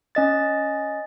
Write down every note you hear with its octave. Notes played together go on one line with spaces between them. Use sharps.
C#4 D#5 A6